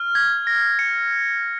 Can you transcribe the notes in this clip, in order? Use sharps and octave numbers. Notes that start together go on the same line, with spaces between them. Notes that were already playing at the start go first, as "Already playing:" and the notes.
Already playing: F6
G#6
A#6
C#7